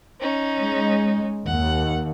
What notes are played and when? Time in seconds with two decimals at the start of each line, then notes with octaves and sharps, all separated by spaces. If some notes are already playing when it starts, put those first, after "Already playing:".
0.20 C#4 D#4
0.57 G#3
1.47 D#2 F#5